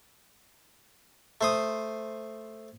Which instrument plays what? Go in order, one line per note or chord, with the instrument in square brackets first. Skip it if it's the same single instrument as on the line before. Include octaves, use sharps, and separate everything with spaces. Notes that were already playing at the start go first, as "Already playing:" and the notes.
[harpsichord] A3 C5 D#6